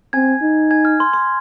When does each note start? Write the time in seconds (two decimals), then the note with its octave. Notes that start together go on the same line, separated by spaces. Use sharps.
0.13 C4 G#5 G#6
0.42 D#4
0.71 G#5 G#6
0.85 F6
1.00 C6
1.13 C6